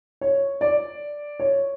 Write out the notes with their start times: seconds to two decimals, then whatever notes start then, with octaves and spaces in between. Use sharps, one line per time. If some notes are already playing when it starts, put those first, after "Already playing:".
0.21 C#5
0.61 D5
1.40 C#5